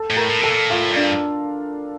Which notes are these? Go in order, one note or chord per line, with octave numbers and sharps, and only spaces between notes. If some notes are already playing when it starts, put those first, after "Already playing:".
Already playing: A4 A5
A2
A#4 A#5
A2
C3 A4 A5
A#2
A2 F4 F5
G2
D4 D5